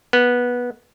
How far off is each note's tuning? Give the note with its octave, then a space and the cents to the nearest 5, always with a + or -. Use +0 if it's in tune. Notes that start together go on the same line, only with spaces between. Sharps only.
B3 -15